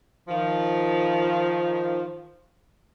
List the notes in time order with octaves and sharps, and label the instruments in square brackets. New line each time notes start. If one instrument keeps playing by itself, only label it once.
[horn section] D#3 F3